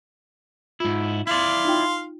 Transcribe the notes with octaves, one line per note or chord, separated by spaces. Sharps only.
G#2 E4 F4
E4 D5 F5 C6
D#4 F4 G5